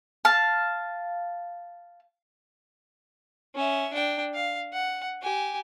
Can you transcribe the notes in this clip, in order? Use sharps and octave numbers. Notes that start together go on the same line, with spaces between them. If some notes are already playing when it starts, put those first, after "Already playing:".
F5 A5
C#4 E5
D4 G5
F5
F#5
G4 G#5